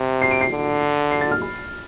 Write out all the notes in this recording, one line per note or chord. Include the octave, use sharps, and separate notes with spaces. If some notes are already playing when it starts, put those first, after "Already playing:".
Already playing: C3
C7
D7
C7
D3
C7
A6
F6
B5